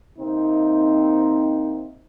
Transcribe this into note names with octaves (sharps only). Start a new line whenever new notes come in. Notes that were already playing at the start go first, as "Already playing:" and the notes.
C3 A#3 C4 D#4